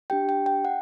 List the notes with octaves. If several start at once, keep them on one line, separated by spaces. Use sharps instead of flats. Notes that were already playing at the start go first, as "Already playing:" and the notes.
D4 G4 G5
G5
G5
F#5